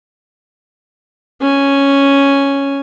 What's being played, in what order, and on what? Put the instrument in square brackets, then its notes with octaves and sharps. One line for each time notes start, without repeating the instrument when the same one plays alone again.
[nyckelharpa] C#4 G#5